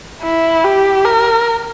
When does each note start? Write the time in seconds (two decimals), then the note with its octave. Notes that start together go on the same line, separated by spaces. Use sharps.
0.22 E4
0.64 G4
1.05 A#4